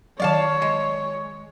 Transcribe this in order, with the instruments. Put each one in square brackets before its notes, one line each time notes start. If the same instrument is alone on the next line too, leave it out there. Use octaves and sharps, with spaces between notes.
[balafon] D#3 F#3 [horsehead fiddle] C#5 [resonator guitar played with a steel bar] D5 F5 A5
[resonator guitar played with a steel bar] G#3